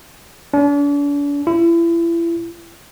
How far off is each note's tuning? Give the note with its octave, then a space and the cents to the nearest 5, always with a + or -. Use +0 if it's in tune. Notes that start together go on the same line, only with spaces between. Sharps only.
D4 -40
E4 +35